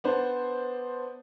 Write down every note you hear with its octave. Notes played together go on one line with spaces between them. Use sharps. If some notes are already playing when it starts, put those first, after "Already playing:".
B3 D4 C5